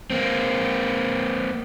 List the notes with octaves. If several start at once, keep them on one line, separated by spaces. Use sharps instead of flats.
A#3 C4